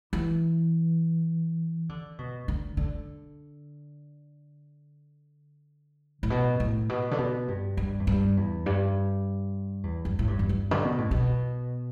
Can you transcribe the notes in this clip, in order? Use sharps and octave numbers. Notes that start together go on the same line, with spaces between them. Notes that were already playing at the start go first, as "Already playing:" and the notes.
E3
D3
B2
D3
D3
A2
B2
A2
B2
D3
B2
G2
G2
E2
G2
E2
G2
E2
G2
A2
G2
E2
G2
D3
B2
A2
B2